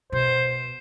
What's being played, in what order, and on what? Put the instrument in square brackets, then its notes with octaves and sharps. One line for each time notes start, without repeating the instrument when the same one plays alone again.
[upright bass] B2 [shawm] C5